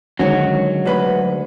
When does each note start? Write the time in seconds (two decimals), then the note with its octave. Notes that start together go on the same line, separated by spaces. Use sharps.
0.19 D3 D#3 F#3 G#3 C#4 C#5
0.86 D2 B4 B5